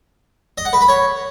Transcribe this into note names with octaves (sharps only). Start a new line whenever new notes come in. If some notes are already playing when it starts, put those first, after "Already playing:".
D#5
F#5
B4
B5
C#5